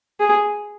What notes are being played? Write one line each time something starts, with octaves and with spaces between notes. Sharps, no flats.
G#4